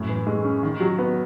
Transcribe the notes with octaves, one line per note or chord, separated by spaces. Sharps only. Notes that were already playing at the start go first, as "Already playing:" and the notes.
Already playing: F#2 A2
E3
G#3
C#4
D#3
F#3
B3